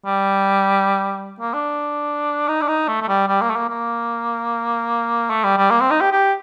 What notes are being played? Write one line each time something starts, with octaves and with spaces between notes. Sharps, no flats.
G3
A#3
D4
D#4
D4
D#4
A3
A3
G3
G3
A#3
A3
A#3
A#3
A3
G3
G3
A#3
C4
D#4
G4
G4